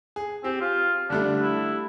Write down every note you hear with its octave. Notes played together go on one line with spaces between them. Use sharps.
G#4
C4 G4
F4
D3 G3 A3 D4
E4